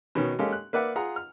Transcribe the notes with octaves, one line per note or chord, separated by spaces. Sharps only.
B2 D#3 C#4
G#3 A#3 C#4 G4 A4 F5
F#6
A#3 B4 D5 E5 F#5
F4 G#4 F#5 A#5
F6